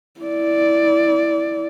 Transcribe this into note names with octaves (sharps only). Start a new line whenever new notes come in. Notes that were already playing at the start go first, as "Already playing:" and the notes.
E4 D5